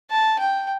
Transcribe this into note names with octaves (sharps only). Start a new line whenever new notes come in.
A5
G5